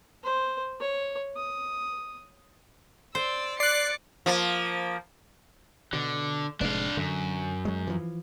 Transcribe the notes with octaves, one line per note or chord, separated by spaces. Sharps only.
C5
C#5
D#6
C5 D5 E6
D5 D6 F#6 C7 C#7
F3 A#3
B2 D3
F1 G#2 G#3 D4 F5
F#2 D3
F#3 G#3
E3 F3